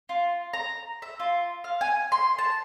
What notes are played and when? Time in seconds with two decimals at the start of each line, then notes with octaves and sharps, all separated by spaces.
0.09 F4
0.53 A#5
1.02 E5
1.20 F4
1.64 F5
1.81 G#5
2.12 C6
2.39 A5